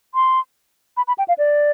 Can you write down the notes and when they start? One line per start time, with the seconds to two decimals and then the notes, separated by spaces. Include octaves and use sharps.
0.15 C6
0.97 B5
1.08 B5
1.18 G5
1.28 F5
1.38 D5